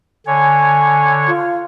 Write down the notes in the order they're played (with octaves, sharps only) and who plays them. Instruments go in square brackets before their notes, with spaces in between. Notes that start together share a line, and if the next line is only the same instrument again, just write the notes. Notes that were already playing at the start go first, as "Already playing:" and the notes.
[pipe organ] D3 C#5 [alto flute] G#5
[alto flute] F4